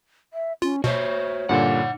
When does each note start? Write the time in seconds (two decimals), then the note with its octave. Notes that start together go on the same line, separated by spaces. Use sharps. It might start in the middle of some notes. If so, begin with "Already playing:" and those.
0.33 E5
0.62 C#4 F4
0.84 B2 F#4 C5 C#5 E5
1.49 G2 A#2 D3 D#4 F#5